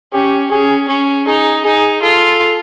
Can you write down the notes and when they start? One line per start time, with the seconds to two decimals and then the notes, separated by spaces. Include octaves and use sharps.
0.13 C#4 G4
0.50 C#4 G#4
0.88 C#4
1.26 D#4 G#4
1.65 D#4 G#4
2.02 F4 A4